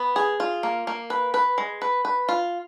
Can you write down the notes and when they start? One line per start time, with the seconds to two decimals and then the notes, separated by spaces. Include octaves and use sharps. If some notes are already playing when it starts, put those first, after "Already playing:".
Already playing: B3
0.16 G#4
0.40 F4
0.63 A#3
0.87 A#3
1.10 B4
1.34 B4
1.58 G#3
1.82 B4
2.05 B4
2.29 F4